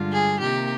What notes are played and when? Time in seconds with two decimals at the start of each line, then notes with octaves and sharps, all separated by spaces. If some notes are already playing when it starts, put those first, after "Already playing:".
Already playing: G2 D3 G#3 D4 F4
0.11 G#4
0.40 C3 D#3 A#3 G4